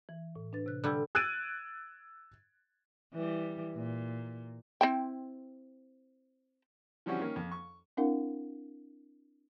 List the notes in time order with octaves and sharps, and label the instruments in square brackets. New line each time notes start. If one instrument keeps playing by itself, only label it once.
[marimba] E3
A2
D4 B4 A6
C3 F#6
[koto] D3 G3 [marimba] D5 E6 G#6
[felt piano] E6 F#6 G#6 A6 D7 D#7
[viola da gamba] E3 G3
A#2
[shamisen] C4 E4 G5
[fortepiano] E3 F3 G3 C4 C#4 F#4
D#3 A#3 C#4
F2
C#6
[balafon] C4 D4 E4 A#4 F5 F#5